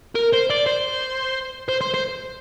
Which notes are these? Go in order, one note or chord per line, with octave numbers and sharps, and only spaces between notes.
A#4
C5
D5
C5
C5
C5
C5